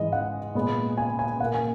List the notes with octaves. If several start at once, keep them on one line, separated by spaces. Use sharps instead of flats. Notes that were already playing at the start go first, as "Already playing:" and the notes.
Already playing: G#2 E3 G#3 D#5
F#5
A#2 G#3 B3
G#5
G#5
A#2 A#3 F#5
G#5